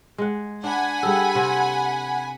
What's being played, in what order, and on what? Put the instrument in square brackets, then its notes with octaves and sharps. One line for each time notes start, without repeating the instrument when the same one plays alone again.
[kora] G#3 F#5
[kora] D4 [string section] F#5 G#5 B5
[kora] G3 G#4 A4
C3